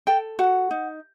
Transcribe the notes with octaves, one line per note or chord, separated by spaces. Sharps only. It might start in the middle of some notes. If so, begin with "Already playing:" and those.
A4 G5
F#4 F#5
D#4